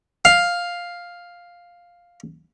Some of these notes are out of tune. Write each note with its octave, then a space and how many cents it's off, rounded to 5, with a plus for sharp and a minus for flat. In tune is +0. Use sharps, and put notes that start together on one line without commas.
F5 +5